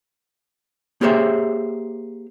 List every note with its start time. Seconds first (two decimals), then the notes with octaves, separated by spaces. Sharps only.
1.01 A#3 G4 G#4 C5 C#5 E5